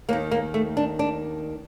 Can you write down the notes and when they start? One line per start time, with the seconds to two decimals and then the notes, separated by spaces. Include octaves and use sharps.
0.09 D#2 D#3 A#3
0.31 A#3
0.54 A3
0.77 D4
0.99 D4